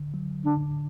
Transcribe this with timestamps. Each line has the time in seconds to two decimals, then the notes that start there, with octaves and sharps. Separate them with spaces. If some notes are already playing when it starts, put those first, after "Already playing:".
Already playing: D3
0.14 F#3
0.46 D3 D4